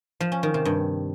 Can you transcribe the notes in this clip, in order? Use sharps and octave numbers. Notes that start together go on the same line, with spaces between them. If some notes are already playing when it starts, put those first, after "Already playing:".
F3
C#4
D#3
C3
G2